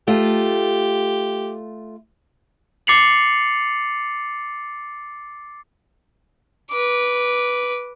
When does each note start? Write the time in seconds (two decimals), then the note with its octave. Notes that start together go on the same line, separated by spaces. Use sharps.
0.08 A3 F4 G4
2.87 D6 A6 C7 C#7 F7 F#7
6.70 B4 D6